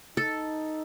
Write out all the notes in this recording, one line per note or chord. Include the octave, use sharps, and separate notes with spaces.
D#4 A4